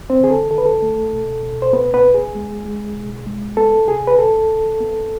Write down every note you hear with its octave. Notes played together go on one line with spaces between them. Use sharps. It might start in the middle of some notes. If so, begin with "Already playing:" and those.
Already playing: D2
C4 C5
D3 G#4
A4
D3 A4
B4
A4
A3
B2
B2
C5
B2 B3 B4
B3 B4
B3
G#4
G#3
G#3
B2
G#3
B3 A4
C3 G#4
B4
C2 A4
C2
B3